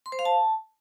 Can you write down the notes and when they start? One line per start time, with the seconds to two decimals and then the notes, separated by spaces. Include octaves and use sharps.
0.06 C6
0.12 C5
0.19 F5
0.25 A5